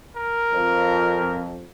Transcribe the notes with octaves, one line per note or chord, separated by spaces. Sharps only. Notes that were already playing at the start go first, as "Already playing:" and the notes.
A#4
F2